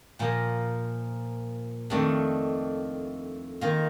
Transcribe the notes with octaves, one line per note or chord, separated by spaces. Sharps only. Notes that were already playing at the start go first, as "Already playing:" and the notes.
A#2 F3 A#3
F2 D#3 A3 D4
D#3 A#3 F4